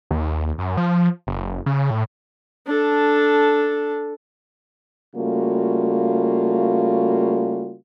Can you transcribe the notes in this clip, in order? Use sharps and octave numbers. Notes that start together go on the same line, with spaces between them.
D#2
F#2
F3
F#1
C#3
A2
D4 A4
C#3 G3 A3 A#3 F4 F#4